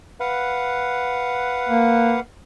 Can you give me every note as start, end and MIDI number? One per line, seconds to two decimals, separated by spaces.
0.20 2.20 71
0.20 2.20 77
0.20 2.20 78
1.69 2.17 58